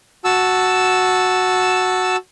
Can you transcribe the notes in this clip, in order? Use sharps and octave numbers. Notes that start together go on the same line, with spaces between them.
F#4 A5 E6